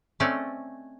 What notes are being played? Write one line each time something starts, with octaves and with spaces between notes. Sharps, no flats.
A3 C4 C#4 D5 D#5